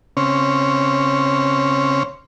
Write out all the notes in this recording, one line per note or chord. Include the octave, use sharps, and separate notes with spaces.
C#3 C4 C#4